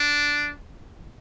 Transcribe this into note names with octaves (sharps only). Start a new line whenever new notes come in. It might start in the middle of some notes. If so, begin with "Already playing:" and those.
Already playing: D4